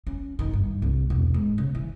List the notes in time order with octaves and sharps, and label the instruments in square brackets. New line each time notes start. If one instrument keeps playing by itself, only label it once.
[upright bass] C#4
D#3
G2
C2
E1
G#2
C#3
E3